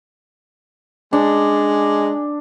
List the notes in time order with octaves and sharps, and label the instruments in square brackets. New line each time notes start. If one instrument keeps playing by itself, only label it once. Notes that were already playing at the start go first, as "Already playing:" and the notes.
[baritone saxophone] G#3 [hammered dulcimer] D4